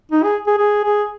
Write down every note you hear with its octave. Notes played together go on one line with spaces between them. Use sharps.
D#4
G#4
G#4
G#4
G#4